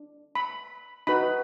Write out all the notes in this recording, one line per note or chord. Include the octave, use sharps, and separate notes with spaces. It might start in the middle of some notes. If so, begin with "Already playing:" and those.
Already playing: D4
B5
D#4 F#4 B4 B5